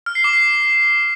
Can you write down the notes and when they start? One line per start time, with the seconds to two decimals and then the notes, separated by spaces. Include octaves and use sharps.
0.06 F6
0.15 C7
0.24 D6
0.33 C7